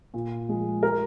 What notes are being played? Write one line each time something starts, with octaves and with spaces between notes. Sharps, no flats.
A#2
F3 G#3
A#4